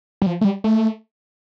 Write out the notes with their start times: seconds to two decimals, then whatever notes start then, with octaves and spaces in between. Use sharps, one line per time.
0.22 G3
0.26 F3
0.41 A3
0.44 G3
0.64 A3